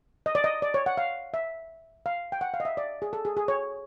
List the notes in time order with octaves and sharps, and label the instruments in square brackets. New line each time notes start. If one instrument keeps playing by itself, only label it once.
[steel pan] D#5
D5
D#5
D5
C#5
F#5
F5
E5
F5
G5
F#5
F5
D#5
E5
D5
G#4
A4
G#4
G#4
C#5